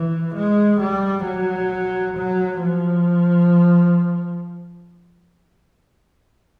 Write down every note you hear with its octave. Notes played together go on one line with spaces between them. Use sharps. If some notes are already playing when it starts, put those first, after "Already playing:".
Already playing: E3
G#3
G3
F#3
F#3
F3